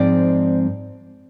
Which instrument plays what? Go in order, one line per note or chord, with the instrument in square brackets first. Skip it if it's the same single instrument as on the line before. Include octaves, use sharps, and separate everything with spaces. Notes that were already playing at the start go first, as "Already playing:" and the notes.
Already playing: [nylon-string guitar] G#2 F3 G#3 C4 D5